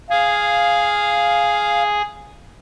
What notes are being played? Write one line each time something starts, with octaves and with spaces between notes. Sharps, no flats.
G#4 F5